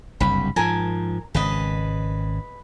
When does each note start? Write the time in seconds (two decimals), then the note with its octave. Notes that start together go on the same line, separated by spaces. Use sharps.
0.20 F#1 C2 G2 B5
0.56 G#2 F3 A#4 G#5 A5
1.35 G#1 C#3 B4 D#5